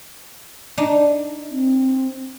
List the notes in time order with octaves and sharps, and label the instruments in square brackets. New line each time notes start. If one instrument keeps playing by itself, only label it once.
[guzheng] D4 D#4
[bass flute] C4